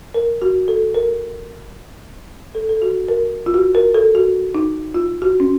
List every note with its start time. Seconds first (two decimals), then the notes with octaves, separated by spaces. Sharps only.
0.14 A#4
0.42 F#4
0.68 A4
0.95 A#4
2.55 A4
2.69 A4
2.82 F#4
3.09 A#4
3.46 F4
3.54 F#4
3.75 A#4
3.94 A4
4.15 F#4
4.55 D#4
4.94 F4
5.22 F#4
5.40 C#4